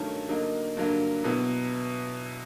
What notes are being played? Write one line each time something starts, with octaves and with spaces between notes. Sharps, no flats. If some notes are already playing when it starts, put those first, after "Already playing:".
Already playing: G2 D#3 F#3 A3 C#4
D3 F#3 A#3 D#4
G2 D3 F#3 A#3
B2 F#3 B3 E4